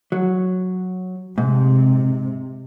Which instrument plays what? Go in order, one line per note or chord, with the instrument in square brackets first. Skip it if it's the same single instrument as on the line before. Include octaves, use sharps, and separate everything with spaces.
[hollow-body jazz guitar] F#3
[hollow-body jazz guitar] G#2 [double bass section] C3